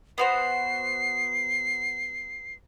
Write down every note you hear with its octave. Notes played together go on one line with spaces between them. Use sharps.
B3 F#4 C5 C7